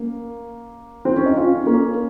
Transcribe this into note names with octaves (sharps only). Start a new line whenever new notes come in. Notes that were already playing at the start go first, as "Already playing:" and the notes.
Already playing: A#3 C#4
C4
C#4
D#4
C#4 F4
A#3 C#4